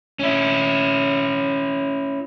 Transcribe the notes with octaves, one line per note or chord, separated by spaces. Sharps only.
C#4 E4